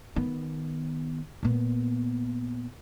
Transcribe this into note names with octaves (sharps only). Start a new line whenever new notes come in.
D#3 B3
A#2 B3